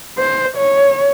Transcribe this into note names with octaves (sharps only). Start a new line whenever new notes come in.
C5
C#5